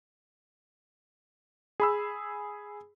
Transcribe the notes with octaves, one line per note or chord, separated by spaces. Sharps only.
G#4 B5 E6